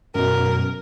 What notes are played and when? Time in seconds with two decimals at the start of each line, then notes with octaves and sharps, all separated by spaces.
0.15 F#2 B2 A#4